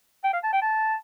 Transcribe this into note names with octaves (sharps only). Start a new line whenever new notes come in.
G5
F5
A5
G5
A5